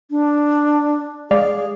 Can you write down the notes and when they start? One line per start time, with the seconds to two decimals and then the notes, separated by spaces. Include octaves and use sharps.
0.11 D4
1.31 G#3 G#4 D5 F5